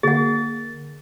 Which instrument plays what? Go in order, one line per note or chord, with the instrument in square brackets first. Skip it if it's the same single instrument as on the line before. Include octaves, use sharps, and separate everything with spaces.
[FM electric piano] D3 A#3 A6 [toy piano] G#4 F#5